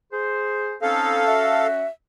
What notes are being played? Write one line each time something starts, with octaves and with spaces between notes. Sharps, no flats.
G#4 C5
C4 C#4 D#4 A4 F5
C#4 F#4 E5